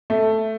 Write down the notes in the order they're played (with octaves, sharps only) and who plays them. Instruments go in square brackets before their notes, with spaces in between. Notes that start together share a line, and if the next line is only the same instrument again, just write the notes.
[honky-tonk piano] A3